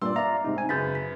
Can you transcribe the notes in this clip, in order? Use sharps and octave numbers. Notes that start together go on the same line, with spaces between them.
G2 A#2 D5 C6 E6
D5 E5 F5 A#5
G#2 C3 D#4
C4 G#5
F#2 C#3 B4 G6 A6 B6
B6